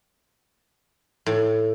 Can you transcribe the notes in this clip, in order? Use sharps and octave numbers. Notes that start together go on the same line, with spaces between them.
A2